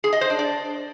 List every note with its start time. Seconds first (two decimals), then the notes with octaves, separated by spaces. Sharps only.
0.04 G#4
0.13 D#5
0.21 C5
0.30 D4
0.39 D5